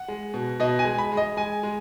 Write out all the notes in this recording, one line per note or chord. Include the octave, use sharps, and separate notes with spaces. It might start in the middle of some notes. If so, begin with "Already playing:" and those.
Already playing: F#5
G#3
B2
B2 D#5
G#5
G#3
B5
G#3
D#5
G#3 G#5
G#3